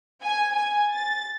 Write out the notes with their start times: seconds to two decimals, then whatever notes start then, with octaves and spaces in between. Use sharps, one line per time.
0.23 G#5
0.55 G#5
0.92 A6